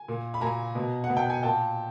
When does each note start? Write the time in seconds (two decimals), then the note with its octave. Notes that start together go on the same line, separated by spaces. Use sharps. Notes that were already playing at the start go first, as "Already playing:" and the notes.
Already playing: G#5
0.08 A#2
0.34 B5
0.41 A#2 G#5 A#5
0.75 B2
1.04 F#5
1.10 B2
1.17 G5
1.30 G#5
1.43 A#2 G5 A5